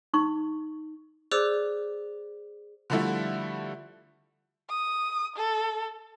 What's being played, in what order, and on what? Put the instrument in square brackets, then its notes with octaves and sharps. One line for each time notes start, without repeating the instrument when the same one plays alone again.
[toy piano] D#4 C#6
[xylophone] G#4 C5 D5 D6 E6 F#6
[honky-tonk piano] D3 F3 G3 A3 E4 F#4
[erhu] D#6
A4